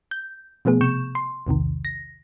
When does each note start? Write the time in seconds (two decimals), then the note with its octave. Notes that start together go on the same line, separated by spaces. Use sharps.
0.11 G6
0.65 B2 F3 A3 B3 G#4
0.81 C3 C#6 G6 E7
1.15 C6
1.47 B1 E2 C3 D#3
1.85 A#6